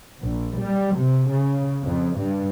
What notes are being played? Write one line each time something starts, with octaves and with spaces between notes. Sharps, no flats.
A#1
G3
C3
C#3
F2
G2